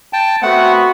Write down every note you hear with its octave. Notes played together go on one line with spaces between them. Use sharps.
G5 A5
A3 B3 C4 F#4 F#5